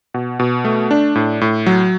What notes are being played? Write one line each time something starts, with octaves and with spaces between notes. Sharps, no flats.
B2
B2
A3
D4
A2
A2
F#3